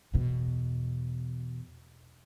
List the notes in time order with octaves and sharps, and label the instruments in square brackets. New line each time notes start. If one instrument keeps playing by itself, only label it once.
[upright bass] E2 B2